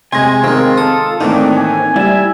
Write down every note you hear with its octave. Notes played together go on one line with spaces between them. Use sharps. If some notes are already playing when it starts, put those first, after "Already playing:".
C3 G#3 G#5 C6 G#6 A#6
D#3 G#3 C4 F4 A#4
A4 D#6
A2 D#3 E3 A#3 C4 D4 D#4
G#5
G3 E4 E5